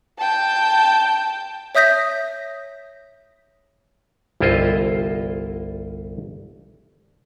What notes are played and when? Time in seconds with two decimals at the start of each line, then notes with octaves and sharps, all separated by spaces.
0.18 G5 A5
1.75 C#5 E5 D#6 G6 A#6 B6
4.40 G1 C2 E4 F4 C5 D#5